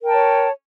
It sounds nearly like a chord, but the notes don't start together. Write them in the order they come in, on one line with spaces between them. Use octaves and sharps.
A#4 G5 A5 C#5